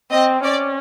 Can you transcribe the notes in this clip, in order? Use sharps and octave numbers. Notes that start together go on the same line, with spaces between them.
C4 D#5
C#4 D5